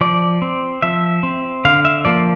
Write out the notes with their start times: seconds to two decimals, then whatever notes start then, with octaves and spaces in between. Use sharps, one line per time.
0.01 F3 D5
0.42 C4
0.82 F3 E5
1.23 C4
1.65 D3 F5
1.85 E5
2.05 F3 A#3 D5